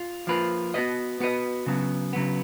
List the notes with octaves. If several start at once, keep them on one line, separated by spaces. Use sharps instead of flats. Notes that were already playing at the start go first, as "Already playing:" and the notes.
Already playing: F4
F3 A#3 F4 B4
B3 F#4 B4 D#5
B3 F#4 B4 D#5
C#3 F#3 B3
C#3 F#3 B3